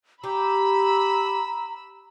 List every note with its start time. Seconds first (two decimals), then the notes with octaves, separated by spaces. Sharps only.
0.24 G4 A#5 B5 E6